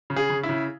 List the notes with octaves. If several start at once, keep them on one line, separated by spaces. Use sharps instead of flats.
C#3
G#4
C#3
E4
C#3